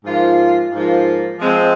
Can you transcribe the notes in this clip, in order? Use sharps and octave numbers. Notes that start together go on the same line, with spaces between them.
G#2 F3 A#3 F4
G#2 F3 A#3 F4
F3 G#3 C4